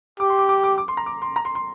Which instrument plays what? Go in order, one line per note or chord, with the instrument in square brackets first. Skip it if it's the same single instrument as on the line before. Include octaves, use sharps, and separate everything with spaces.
[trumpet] G4 [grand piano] D6
[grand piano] C6
D6
D6
D6
D6
C6
A#5
D6
C6
A#5
C6
C6